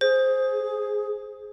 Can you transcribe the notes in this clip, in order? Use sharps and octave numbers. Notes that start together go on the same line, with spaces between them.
G#4 C5